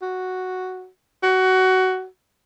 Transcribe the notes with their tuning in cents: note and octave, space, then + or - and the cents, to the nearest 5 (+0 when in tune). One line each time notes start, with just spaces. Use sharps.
F#4 +0
F#4 +15